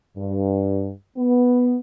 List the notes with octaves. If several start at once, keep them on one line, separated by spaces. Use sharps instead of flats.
G2
B3